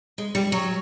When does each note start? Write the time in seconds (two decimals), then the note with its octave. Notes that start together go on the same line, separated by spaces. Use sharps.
0.18 G#3
0.35 G3
0.52 F#3